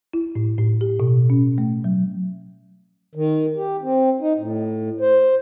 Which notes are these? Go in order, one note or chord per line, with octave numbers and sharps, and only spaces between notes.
E4
A2
A2
G4
B2
C#4
A3
F#3
D#3
G4
C4
D#4
A2
C5